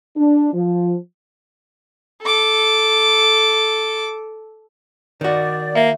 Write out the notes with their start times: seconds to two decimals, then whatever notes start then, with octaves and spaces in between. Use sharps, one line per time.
0.17 D4
0.54 F3
2.22 A4 D6
5.21 D#3 F#4 D5
5.75 A#3 E5